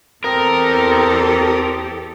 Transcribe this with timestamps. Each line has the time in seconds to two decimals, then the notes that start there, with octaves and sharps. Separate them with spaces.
0.24 E2 C4 G4 A4 A#4 D#6